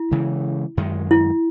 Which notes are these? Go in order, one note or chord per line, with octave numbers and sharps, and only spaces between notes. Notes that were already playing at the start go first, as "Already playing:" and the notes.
Already playing: E4
C#3 E3 G#3
F#2 D#3 G#3
E4